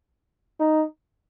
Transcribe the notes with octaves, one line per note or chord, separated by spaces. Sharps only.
D#4